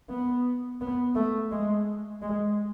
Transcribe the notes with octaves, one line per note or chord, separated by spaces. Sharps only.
B3
B3
A3
G#3
G#3